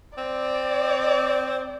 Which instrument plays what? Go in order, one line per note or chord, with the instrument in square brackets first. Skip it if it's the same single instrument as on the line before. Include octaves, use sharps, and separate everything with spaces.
[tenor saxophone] C4 [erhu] D5